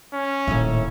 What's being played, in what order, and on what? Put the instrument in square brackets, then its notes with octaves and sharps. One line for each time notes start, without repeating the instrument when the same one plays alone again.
[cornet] C#4
[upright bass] D#1 [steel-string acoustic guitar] D#2 A2 E5